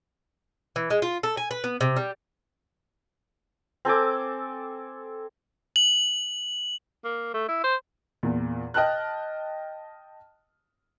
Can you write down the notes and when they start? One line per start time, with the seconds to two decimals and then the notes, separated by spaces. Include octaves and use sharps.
0.76 E3
0.90 G#3
1.02 F4
1.23 A4
1.37 G#5
1.51 B4
1.64 B3
1.81 C3
1.96 G3
3.85 C4 A4 G#5 D6
5.76 F#7
7.04 A#3
7.34 A3
7.48 E4
7.64 C5
8.23 E2 A#2
8.74 D#5 G5 A5 F6 F#6